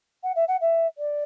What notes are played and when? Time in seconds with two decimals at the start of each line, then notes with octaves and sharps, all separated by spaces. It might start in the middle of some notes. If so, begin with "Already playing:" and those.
0.23 F#5
0.36 E5
0.48 F#5
0.61 E5
0.98 D5